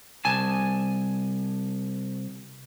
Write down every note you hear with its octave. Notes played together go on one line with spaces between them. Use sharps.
C2 G#5 A5